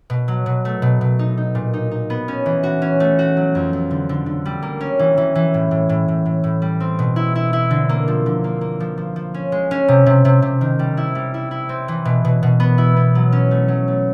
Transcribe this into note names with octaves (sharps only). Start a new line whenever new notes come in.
B2
F#3
B2
A3
B2
B2
D#4
D#4
A#2
D#4
D#4
B3
C#4
E3
F#4
C#4
A3
F#4
F#3
F2
F2
D3
D3
D3
G3
A#3
C#4
E3
E3
E3
A2
A2
A2
A2
A2
A2
G3
C4
B2
E4
E4
E4
D3
A#3
F3
D3
A#3
A#3
F3
F3
F3
C#4
G#3
C#4
C3
C3
C3
C3
D#3
G3
E4
G3
E4
E4
C4
E3
B2
B2
B2
B3
E4
B3
F#3
C#4
A3
F#3
A3